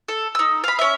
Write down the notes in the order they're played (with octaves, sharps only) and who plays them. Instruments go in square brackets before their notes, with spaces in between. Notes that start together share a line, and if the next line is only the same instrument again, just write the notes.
[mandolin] A4
D#4 E6
F5 B5
C#4 E5